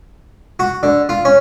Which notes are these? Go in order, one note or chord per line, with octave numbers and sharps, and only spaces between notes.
F#4
D3
F4
C#4